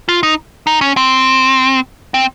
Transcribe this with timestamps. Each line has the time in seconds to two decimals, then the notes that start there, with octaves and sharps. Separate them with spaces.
0.09 F4
0.23 D#4
0.67 D#4
0.81 C#4
0.97 C4
2.14 C4